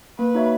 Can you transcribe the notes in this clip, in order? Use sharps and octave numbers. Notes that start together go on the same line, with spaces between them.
A#3 B4
D#4 F#4 C#5 E5